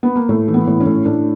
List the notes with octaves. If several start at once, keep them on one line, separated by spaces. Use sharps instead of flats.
B3
A#3
A2 A3
E3
B3
A2
C#4
A2
A2 D4